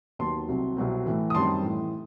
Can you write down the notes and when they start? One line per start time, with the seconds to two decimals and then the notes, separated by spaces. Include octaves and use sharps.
0.19 D#2 D#3 F#3 B3 A5 C6
0.49 C2 C3 F#3
0.76 C2 B2 F#3 C4
1.06 A2 E3 A3
1.30 D#6
1.34 F#2 D#3 G3 C4 A5 C6
1.62 A2 E3 A3